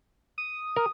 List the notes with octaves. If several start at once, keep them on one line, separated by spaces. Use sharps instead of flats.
D#6
A#4